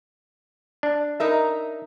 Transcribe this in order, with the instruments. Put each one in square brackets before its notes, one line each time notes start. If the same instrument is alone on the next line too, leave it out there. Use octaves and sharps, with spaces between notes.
[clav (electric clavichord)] D4
[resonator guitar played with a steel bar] D#4 A#4 E5